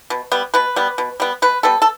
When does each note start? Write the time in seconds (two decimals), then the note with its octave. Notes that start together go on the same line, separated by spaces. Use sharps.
0.10 B2
0.32 G3 B3
0.54 B2 B4
0.76 G3 B3
0.98 B2
1.20 G3 B3
1.42 B2 B4
1.63 G3 B3 A4
1.82 A4